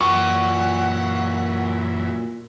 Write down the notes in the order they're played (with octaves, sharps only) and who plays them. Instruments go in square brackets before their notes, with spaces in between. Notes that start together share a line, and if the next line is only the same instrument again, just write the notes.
[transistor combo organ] F#2 E3 [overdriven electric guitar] A#2 [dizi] F#5 [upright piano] C#6